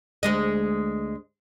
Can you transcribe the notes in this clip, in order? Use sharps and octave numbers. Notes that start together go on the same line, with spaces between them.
D2 G#3 D#5